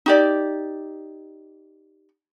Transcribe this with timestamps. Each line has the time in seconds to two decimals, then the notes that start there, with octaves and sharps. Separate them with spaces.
0.06 D#4 G4 D5